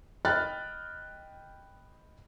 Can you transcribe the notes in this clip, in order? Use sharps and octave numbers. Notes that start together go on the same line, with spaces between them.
D#5 G5 B5 F6 F#6 A6